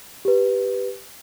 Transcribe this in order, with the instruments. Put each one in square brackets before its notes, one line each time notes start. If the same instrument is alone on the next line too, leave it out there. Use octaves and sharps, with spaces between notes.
[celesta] G4 B4